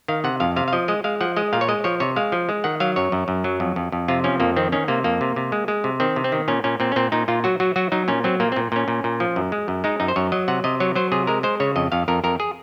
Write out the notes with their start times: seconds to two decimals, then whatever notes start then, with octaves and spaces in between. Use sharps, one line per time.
0.08 D#3 F5
0.24 C3 F#5
0.40 F2 F5
0.56 C3 F5
0.68 F5
0.73 F3 D#5
0.88 G#3 D#5
1.04 G#3 F5
1.21 F3 F#5
1.36 G#3 D#5
1.53 A#2 F5
1.61 C#5
1.68 G#3 D#5
1.84 F3 C#5
2.00 C3 C#5
2.16 G#3 F5
2.32 F3
2.49 G#3
2.64 D#3 F#5
2.80 F#3 F5
2.96 F#2 C#5
3.12 F#2
3.28 F#2
3.44 F#3
3.60 F2
3.76 F2
3.92 F2
4.08 C3 F4
4.24 F3 C#4
4.40 F2 A#3
4.56 D#3 C4
4.72 D#3 C#4
4.88 C3 A#3
5.04 F2 A#3
5.21 C3
5.36 C3
5.52 G#3
5.68 G#3
5.84 C3
6.00 D#3 C4
6.16 C3
6.24 C4
6.32 D#3
6.48 A#2 C#4
6.64 A#2 C#4
6.80 A#2 C4
6.92 C#4
6.96 A#2 C4
7.12 A#2 D#4
7.28 A#2 F4
7.44 F#3 F#4
7.60 F#3 F#4
7.76 F#3 F#4
7.92 F#3 D#4
8.08 A#2 C#4
8.24 F#3 C4
8.40 A#2 A#3
8.52 C4
8.56 A#2
8.72 A#2 C#4
8.88 A#2
9.04 A#2
9.20 F3
9.36 F#2
9.52 G#3
9.68 F#2
9.84 G#3 D#4
10.00 F#2 D#4
10.08 C5
10.16 F#2 C#5
10.32 F#3 D#5
10.48 C3 F#5
10.64 C3 D#5
10.80 F#3 C#5
10.96 F#3 C5
11.12 C3 G#4
11.27 G#3 A#4
11.43 G#3 C5
11.60 C#3 C#5
11.76 F2 D#5
11.92 F2 F5
12.08 F2 A#4
12.24 F2 A#4
12.40 G#4